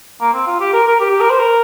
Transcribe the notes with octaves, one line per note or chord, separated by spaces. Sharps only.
A#3
C4
F4
G4
A#4
A#4
G4
G4
A#4
C5
A#4